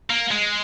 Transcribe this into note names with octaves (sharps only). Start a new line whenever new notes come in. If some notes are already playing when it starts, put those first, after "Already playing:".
A#3
G#3